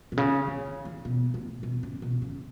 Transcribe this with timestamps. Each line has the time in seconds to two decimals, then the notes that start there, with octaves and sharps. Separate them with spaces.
0.12 B2
0.17 C#3
0.47 D3
0.67 E3
0.85 D3
1.05 B2
1.34 A2
1.63 B2
1.83 C#3
2.02 B2
2.22 C#3